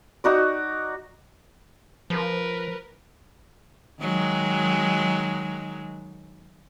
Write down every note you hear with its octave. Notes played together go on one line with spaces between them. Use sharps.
D#4 F#4 D5
F3 A#4 B4
D#3 F#3 G#3